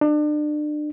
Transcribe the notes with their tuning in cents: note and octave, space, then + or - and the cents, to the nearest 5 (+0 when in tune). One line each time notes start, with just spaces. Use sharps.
D4 +35